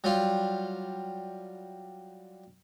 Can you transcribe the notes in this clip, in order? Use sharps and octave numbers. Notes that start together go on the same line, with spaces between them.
F#3 G3 F4